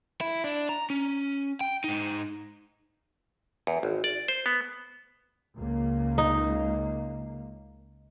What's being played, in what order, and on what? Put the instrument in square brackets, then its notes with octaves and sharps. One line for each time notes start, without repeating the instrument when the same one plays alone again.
[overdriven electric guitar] E4
D4
A#5
C#4
G5
G#2 D#4
[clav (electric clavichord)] E2
G#1
D5
C5
B3
[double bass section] C#2 C#3 A#3
[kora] D#4